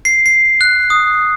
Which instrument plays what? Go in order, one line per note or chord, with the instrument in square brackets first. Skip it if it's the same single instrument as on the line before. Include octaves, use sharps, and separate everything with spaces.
[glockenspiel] C7
C7
F#6
D#6